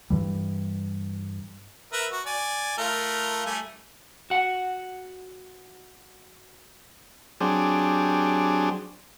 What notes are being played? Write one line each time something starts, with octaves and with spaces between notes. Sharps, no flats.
G2 E3 G3
A#4 B4 E5
F#4
D5 G#5
A3 F4 A#4
G3 A3 G#5
F#4 F#5
F#3 C4 D4 G4 G#4